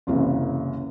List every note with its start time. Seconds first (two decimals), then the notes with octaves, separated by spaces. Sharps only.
0.07 F#1 C2 F#2 C#3 E3